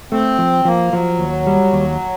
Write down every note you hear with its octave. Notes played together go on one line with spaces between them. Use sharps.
A3 C4
F3
F3 A#3
F3 F#3
D#2
G3
D#2